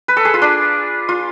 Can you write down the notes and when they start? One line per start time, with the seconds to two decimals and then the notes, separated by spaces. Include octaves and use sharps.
0.08 B4
0.17 A4
0.25 G#4
0.34 F4
0.42 D4
1.09 F4